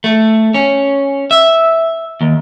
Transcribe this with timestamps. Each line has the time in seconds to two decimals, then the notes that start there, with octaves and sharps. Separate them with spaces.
0.04 A3
0.54 C#4
1.31 E5
2.21 D#2